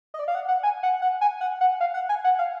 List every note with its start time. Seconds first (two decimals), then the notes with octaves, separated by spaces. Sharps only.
0.14 D#5
0.19 D5
0.28 F5
0.35 F#5
0.48 F#5
0.63 G#5
0.83 F#5
1.02 F#5
1.21 G#5
1.41 F#5
1.61 F#5
1.80 F5
1.94 F#5
2.09 G#5
2.24 F#5
2.39 F5